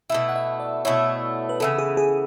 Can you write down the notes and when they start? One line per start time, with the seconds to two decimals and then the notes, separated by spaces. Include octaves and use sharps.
0.10 B2 A3 E4 E5
0.29 F#5
0.36 E5
0.60 D5
0.85 B2 A3 E4 C#5
1.49 B4
1.60 C#3 E3 B3 A4
1.78 G#4
1.97 G#4